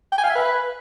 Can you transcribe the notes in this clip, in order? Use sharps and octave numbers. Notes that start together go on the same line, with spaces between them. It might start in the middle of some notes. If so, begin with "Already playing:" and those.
G5
G#5
F5
E5
B4